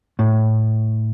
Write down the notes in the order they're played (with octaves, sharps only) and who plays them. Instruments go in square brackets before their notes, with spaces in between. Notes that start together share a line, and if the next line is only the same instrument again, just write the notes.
[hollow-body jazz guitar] A2